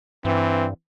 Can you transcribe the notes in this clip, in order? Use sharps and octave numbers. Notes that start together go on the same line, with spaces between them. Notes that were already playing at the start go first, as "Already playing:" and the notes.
G2 E3 C4